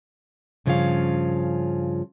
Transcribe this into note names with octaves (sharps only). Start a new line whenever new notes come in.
G2 C#3 F3 F#3 C#4 F5